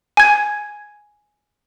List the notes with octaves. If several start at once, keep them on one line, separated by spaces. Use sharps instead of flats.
G#5 G#6